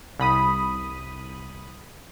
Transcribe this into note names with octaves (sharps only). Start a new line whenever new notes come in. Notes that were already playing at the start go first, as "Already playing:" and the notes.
C2 B5 D#6